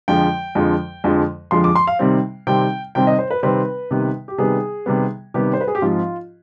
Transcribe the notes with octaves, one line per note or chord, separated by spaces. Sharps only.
F2 D3 F3 G#3 G5
F2 D3 F3 G#3
F2 D3 F3 G#3
F2 D3 F3 G#3 C6
D6
C6
F5
C3 D#3 G3 C4
C3 D#3 G3 C4 G5
C3 D#3 G3 C4 G5
D#5
C5
B4
C3 D#3 G3 C4 B4
C3 D#3 G3 B3
G4
C3 D#3 G3 B3 G#4
C3 D#3 G3 B3
C3 D#3 G3 B3 G4
C5
B4
G#4
G4
G#2 F3 C4 F4